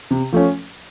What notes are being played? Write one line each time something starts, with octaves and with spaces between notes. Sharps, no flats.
C3
F3 A3 C#4